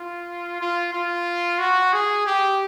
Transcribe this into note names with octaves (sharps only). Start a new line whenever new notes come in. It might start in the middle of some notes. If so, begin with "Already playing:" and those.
Already playing: F4
F4
F4
F#4
G#4
G4